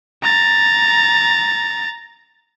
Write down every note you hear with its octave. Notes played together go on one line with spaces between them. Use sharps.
A#5 A6